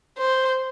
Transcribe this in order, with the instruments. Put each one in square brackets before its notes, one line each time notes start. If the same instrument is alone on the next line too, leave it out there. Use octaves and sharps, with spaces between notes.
[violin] C5